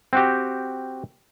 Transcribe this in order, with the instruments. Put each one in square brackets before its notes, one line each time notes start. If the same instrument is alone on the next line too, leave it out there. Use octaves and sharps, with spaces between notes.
[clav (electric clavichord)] C4 F#4 G4